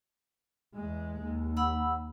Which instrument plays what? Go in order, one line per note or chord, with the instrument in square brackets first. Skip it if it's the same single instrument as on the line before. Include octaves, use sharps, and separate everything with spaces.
[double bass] E2 G#3
D#2
[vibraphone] F#5 B5 E6